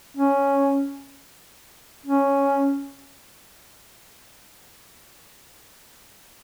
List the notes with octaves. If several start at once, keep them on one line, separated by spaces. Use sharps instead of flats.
C#4
C#4